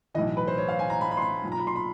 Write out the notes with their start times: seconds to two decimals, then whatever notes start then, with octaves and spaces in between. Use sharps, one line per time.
0.14 B1 A2 E3 D#5
0.37 B4
0.47 C5
0.58 C#5
0.69 F5
0.79 G#5
0.90 A#5
1.01 B5
1.11 B5
1.17 C6
1.22 B5
1.44 B1 A#2
1.52 A#5
1.60 B5
1.67 C6
1.76 B5